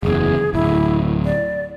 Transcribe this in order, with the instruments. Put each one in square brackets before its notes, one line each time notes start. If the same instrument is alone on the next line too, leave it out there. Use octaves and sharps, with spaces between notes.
[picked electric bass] F#1 E2 [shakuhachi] G#4
[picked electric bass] D1 G#1 [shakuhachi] E4
[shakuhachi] D5